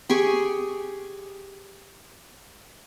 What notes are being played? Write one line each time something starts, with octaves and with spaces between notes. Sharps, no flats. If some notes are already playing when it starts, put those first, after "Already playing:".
G4 G#4 G#5 C#6